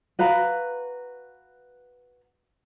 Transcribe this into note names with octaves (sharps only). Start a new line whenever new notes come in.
F#4 B4 F5 A#5